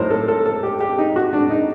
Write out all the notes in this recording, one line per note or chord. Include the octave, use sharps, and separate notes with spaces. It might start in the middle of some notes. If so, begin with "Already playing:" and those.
Already playing: A2 F#3 D#4 A#4 C5
A4
A4
A4
G4
G4
D#4
F#4
D4
D#4